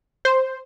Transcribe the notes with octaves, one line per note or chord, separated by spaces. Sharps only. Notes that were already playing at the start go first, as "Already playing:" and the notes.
C5